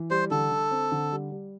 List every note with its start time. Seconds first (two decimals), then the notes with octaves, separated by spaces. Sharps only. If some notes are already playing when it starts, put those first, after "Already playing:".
Already playing: E3
0.11 G3 C5
0.31 D3 A4
0.51 D3
0.71 C4
0.92 D3
1.12 G3
1.32 G3